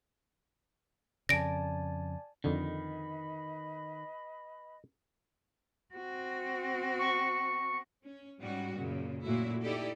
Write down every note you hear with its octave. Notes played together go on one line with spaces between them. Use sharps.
F2 C#3 D5 G#5 A5 A#6 D7
F2 D3 D#3 B4 D#5 B5
C4 F#4
C#6
C#4
G#2 G3 C#4 F#4
F#2 A#2 C#3
A#2 F#3 A3 E4 F#4
D#4 E4 G4 A4 D5